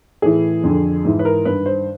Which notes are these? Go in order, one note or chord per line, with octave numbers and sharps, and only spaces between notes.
A2 E3 G#4
F2 D3
G#2 E3
B4
A#4
G2 D#3 B4
C5